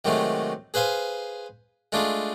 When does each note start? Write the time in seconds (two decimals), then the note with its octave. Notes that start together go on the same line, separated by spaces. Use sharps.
0.05 C3 D#3 F#3 G#3 A3
0.74 G#4 B4 C5 F5 G#5
1.92 G#3 A3 D4 F4 G#4